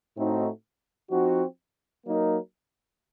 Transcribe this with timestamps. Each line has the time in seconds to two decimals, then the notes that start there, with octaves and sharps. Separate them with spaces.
0.15 A2 A3 C4 D#4 F#4
1.10 F3 C4 D#4 F#4
2.05 F#3 A#3 D#4 A#4